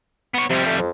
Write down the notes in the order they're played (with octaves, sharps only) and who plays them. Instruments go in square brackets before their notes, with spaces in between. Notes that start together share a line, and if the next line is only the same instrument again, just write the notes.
[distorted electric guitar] B3 C#5
[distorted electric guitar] F2 G3 [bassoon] C3
[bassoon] A3
F2